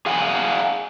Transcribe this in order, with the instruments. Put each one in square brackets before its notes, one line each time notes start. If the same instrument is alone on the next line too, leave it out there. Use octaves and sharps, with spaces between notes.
[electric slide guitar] G#4 F5 F#5 G#5